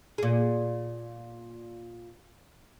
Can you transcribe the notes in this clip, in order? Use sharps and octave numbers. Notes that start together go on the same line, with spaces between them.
A#2 G#4